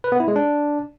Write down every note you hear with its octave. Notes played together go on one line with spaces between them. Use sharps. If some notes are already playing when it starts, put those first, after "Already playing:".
B4
B3
E4
G#3
D4